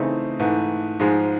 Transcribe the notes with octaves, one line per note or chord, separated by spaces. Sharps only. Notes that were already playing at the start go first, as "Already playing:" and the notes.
Already playing: C#3 E3 A3 C4 D#4
G#2 E3 A3
G#2 F3 G#3